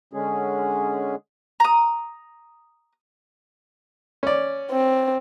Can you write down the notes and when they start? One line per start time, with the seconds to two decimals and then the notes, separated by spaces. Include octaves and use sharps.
0.13 D3 G#3 C#4 G#4
1.60 A#5 D#6
4.23 C#4 D5
4.71 C4